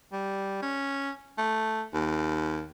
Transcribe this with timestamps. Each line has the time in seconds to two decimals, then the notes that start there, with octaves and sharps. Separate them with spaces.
0.12 G3
0.62 C#4
1.38 A3
1.94 D#2